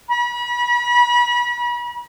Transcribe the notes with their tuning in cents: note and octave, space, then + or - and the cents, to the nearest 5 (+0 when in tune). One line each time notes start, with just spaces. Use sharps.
B5 -35